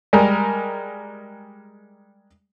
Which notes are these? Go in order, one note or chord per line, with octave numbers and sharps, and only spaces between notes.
G3 G#3 A#4